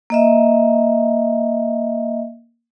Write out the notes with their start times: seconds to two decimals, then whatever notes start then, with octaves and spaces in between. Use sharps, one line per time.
0.10 A#3 D#5 E5